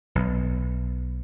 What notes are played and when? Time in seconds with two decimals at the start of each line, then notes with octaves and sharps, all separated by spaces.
0.15 B1